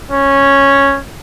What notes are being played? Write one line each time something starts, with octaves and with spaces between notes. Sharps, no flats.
C#4